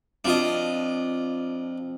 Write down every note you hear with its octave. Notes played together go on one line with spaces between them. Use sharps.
F2 D4 F4 D#5